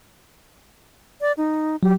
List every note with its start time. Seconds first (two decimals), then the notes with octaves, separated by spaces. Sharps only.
1.21 D5
1.37 D#4
1.83 F#3 G4